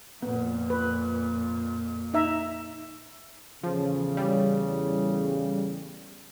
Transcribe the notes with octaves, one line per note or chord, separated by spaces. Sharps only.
F2 A#2 B3
B4
D#4 E5 A#5
E2 A2 C#3 F3
G3